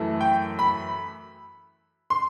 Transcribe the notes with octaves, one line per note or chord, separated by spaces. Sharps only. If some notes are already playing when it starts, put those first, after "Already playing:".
Already playing: F#2 E3 A3
G5
B5
C6